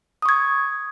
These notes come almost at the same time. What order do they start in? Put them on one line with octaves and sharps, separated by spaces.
D#6 C#6 G#6